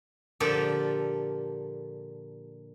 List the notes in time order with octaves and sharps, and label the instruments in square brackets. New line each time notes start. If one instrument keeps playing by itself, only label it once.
[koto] A#2 D3 F3 A#3 G4 A4